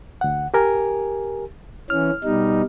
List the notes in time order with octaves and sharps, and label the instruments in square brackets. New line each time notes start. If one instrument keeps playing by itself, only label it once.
[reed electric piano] D2 F#5
G4 A#4 G#5
[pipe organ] E3 C#4 [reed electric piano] F6
[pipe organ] B2 G3 D#4